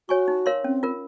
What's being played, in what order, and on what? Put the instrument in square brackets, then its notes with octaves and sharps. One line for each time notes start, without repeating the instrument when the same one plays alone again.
[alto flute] F#4 [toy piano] C#5 G#5 C#6
[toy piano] D#4
A#4 C#5 F5 C6
[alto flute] C4 [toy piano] C#4
[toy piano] F4 A#4